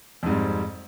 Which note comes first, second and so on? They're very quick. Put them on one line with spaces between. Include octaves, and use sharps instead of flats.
F2 G#2 G3